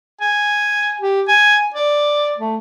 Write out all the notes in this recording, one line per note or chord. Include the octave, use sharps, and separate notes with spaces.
G#5
G4
G#5
D5
A3